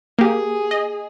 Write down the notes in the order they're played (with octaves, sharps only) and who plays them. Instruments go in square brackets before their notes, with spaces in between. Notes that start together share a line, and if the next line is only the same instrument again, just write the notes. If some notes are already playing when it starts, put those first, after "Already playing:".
[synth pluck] A#3 G4 [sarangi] G#4
[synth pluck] D#5